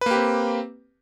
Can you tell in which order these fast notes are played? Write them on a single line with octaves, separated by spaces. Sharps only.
B4 A#3 G4 C4